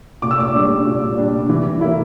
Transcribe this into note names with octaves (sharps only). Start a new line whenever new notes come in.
A#2 D6
E6
D6
G3 D4
A#2
G3 D4
E3
A#3 E4